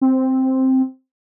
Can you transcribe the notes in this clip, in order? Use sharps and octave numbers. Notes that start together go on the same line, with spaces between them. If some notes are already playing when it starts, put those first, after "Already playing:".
C4